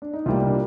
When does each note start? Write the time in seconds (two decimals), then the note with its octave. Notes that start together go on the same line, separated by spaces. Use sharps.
0.02 D4
0.13 D#4
0.26 C2 A#2 G3 A#3 F4
0.46 D4